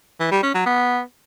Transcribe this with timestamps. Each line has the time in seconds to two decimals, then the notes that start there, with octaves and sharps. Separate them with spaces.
0.20 E3
0.31 G3
0.43 C#4
0.54 F#3
0.66 B3